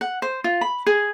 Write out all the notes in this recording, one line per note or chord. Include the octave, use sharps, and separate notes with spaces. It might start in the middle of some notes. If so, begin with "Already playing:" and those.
F#5
C5
F4
B5
G#4